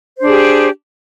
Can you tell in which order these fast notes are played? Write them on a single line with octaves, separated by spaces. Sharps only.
C5 D4 G#4 G4